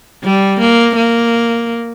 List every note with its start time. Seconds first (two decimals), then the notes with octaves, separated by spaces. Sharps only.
0.24 G3
0.60 A#3
0.96 A#3